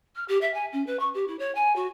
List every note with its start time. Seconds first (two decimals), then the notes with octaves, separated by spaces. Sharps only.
0.16 F6
0.28 G4
0.41 E5
0.54 G#5
0.72 C#4
0.86 B4
0.99 C#6
1.14 G4
1.28 E4
1.39 C#5
1.55 G#5
1.76 F#4